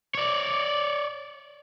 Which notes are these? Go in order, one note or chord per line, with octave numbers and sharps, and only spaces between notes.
C#5 D5